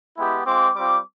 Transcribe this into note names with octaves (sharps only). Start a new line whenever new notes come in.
G#3 B3 E4 G4
G#3 C4 F4 D6
G3 C4 F4 D6